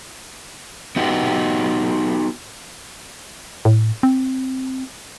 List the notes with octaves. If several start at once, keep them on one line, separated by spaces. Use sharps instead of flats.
B3 D#4 F#4 G4
A2
C4